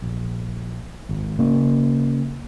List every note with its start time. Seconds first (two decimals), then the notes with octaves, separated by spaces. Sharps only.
0.02 A#1
1.09 G#1
1.39 C#3 A#3